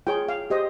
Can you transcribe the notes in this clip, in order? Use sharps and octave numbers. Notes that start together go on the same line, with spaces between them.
F4 G#4 C#5 G5
F5
G4 C5 D#5